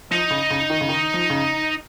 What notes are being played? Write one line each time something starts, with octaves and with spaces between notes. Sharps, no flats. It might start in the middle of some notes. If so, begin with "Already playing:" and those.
F3 D#4
C#3
C#3
D#3
C#3
D#3
F3
C#3